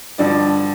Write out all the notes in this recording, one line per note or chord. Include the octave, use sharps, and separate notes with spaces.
G2 D3 F3 D5